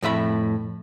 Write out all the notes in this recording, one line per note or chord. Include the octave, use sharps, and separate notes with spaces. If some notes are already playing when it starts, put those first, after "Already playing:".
F2 A2 E5 B5